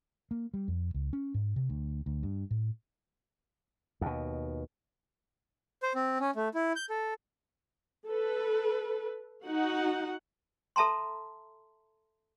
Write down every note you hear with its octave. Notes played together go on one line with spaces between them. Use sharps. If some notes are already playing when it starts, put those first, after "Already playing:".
A#3
G3
F2
C#2
C#4
G#2
C3
D2
D2
G2
A2
D#2 B2
C5
C4
C#4
A3
E4
G6
A4
A4 B4
D#4 F#4 F#5
A4 E5 A5 A#5 C6